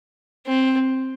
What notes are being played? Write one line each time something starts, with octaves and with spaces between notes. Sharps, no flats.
C4